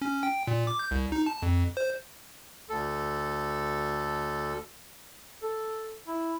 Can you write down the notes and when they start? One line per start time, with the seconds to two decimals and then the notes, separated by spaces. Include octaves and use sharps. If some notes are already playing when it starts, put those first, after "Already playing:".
0.02 C#4
0.23 G5
0.47 A#2
0.67 D6
0.79 G6
0.91 C2
1.12 D#4
1.26 A5
1.42 F2
1.77 C5
2.69 D2 A4
5.43 A4
6.08 E4